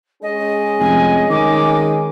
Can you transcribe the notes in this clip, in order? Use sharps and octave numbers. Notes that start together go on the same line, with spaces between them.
G#3 C#4 G#4 D#5
F1 G#5
D#3 D6